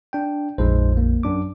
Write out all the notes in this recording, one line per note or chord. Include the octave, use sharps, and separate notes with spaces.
D4 G5
A#1 F2 G#3 D#4 C5
A#3
F#2 D4 D6